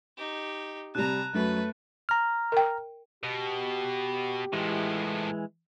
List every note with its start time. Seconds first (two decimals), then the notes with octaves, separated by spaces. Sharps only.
0.18 D#4 G4
0.95 C3 G3 A5 A#5 F#6 D#7
1.34 F#2 A3 F#4 B4
2.09 A#5 F6
2.52 A#4 G5
3.24 B2 G4
4.53 A2 E3 F3 G#3